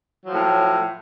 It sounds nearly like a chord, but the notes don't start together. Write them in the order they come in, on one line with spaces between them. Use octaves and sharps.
F#3 F3 A2